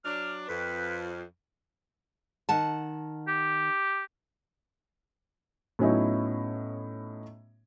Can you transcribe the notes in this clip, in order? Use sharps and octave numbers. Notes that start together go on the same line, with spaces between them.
F#3 D4 F6
F2 B4
D#3 F#5 A5
G4
A2 F#3 B3 C#4 D#4 E4